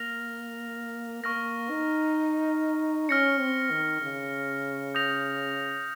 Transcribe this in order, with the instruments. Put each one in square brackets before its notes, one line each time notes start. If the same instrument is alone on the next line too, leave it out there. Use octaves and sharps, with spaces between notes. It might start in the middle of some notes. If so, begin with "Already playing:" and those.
Already playing: [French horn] A#3 [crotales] F6 A#6 F7
[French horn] A#3 [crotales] C#6 F6 A#6
[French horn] D#4
[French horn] C#4 [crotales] F6 A#6 C#7
[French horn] C4
D#3
C#3
[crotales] D#6 G6 A#6 F7